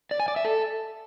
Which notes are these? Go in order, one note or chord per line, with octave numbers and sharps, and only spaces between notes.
D5
G#5
D5
E5
A4